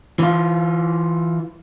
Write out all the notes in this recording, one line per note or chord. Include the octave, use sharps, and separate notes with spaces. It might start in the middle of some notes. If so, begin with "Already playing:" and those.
E3 F4